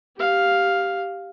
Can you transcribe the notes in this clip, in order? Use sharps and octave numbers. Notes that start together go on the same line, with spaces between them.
G4 F5